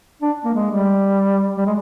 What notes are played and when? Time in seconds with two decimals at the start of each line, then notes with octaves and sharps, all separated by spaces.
0.22 D4
0.44 A#3
0.54 G#3
0.71 G3
1.57 G3
1.66 G#3